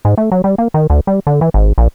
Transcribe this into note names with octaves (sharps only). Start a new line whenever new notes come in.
G#2
A3
F#3
G3
A#3
D#3
D2
G3
D3
E3
G#1
A#1